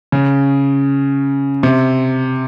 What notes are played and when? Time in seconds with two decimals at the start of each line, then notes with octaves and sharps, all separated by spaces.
0.12 C#3
1.63 C3